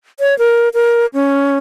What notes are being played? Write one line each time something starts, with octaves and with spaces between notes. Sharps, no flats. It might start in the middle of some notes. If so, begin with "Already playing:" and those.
C#5
A#4
A#4
C#4